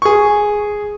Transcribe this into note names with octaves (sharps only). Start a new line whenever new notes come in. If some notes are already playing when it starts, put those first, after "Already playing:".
G#4 C#6